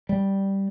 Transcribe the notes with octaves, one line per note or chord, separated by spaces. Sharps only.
G3